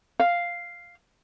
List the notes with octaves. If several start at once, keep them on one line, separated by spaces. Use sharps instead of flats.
F5